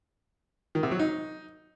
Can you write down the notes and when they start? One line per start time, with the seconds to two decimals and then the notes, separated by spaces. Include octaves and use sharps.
0.75 D#3
0.83 C3
0.91 F#3
0.99 D#4